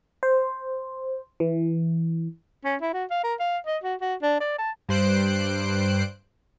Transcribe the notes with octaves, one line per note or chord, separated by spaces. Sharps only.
C5
E3
C#4
E4
F#4
F5
A#4
F5
D#5
F#4
F#4
D4
D5
A5
G2 G3 C5 F#6 C7 D7